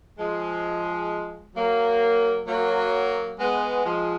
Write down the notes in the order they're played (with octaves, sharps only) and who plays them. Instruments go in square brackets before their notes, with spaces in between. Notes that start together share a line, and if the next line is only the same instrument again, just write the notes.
[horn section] F3 G#3
F#3 A#3
F#3 A#3
G#3 B3
F3 G#3